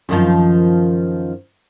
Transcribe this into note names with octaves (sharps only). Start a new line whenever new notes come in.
F#2 D#3 F3